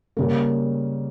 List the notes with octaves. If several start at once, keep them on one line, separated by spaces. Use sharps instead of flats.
C#3 G3 A#3